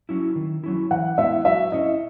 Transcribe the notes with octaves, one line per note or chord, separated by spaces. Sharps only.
F#3 C#4 E4
D#3
F#3 C#4 E4
E3 F#5
G#3 B3 E4 E5
F#3 E5
C#4 E4 D#5